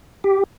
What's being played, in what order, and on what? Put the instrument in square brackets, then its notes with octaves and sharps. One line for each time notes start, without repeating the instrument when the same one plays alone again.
[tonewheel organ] G4